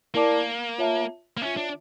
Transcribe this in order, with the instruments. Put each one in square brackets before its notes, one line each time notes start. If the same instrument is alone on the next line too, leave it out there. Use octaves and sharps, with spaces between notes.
[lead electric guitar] A#3 [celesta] E4 A#4 D5 A5 D6
[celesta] F4 C#5 E5 A5
[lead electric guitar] A#3
[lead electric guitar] C#4 [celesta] F4 C#5 E5
[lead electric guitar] D4